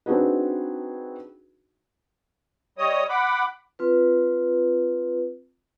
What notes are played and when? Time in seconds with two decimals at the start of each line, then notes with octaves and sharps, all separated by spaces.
0.06 C4 D4 D#4 F#4 G#4 B4
2.78 G3 C#5 D#5 D#6
3.09 F#5 B5 D6
3.79 C4 F4 B4